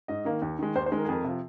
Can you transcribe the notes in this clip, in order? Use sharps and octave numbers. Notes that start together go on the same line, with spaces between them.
G#2 D#5
D#3 A#3
D#2
D#3 G#3
D#2 C5
C5
D#3 G#3
A#4
G#4
F2 A#4
C3 F3